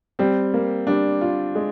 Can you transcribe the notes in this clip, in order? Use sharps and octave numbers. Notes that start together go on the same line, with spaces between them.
G3 C4
A#3
G3 D4
F4
G#3